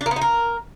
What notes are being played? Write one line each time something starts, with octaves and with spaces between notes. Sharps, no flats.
D4
A#3
B3
D#4
A#4